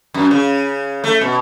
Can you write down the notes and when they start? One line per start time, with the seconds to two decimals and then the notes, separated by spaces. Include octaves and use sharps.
0.14 F#2
0.31 C#3
1.04 A3
1.21 B2